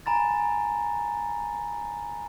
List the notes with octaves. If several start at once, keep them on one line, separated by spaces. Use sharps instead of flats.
G#5 A#5 B5 A6